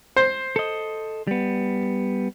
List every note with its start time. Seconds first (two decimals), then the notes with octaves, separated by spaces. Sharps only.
0.16 C5
0.56 A4 D#5
1.27 G3 B3